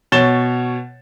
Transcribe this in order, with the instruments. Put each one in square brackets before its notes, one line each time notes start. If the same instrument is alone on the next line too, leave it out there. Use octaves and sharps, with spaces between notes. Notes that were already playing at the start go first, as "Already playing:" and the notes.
[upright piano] B2 C#5 A6 E7 G7